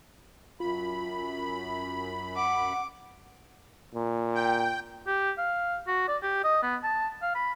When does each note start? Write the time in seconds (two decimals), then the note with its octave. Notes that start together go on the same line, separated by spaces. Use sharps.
0.60 F#2 F4 B5
2.37 F#5 D6
3.94 A#2
4.35 G5
5.07 G4
5.38 F5
5.87 F#4
6.08 D5
6.23 G4
6.44 D#5
6.63 B3
6.84 A5
7.22 F5
7.35 B5